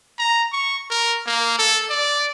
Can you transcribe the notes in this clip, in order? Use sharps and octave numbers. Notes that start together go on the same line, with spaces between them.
A#5
C#6
A#4
A#3
A4
D5